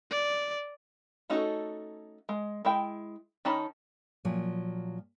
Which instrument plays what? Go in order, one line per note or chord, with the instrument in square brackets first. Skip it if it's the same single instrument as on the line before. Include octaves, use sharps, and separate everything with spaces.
[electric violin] D5
[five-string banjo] A3 C#4 D#4 F#4 A4
G#3
G#3 E4 G5
D#3 C#4 D#4 A5 B5
[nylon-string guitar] A#2 F3 F#3